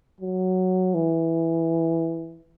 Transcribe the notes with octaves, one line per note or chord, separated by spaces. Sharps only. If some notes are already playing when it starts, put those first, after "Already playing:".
F#3
E3